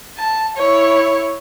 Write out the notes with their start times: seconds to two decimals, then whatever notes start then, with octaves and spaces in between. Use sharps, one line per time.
0.17 A5
0.56 E4 C#5